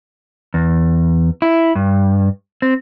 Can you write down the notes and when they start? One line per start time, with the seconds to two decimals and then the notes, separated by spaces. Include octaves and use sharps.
0.54 E2
1.42 E4
1.75 G2
2.62 C4